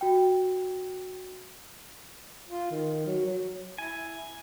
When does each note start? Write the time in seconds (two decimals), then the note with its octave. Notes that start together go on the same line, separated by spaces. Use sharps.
0.01 F#4 G5
2.49 F4
2.71 D#3
3.06 F#3
3.26 F#3
3.78 E4 G#5